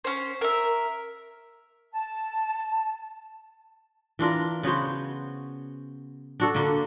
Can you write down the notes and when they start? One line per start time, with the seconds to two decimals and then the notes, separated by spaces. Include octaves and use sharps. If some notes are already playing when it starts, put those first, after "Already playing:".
0.04 C#4 C5
0.41 A#4 E5
1.92 A5
4.19 E3 D4 F4 A#4
4.63 C#3 B3 F#4 C5
6.40 D4 F#4 A4
6.55 D3 A#3